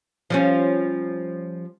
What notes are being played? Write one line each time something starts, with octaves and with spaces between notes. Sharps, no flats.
F3 G3 C#4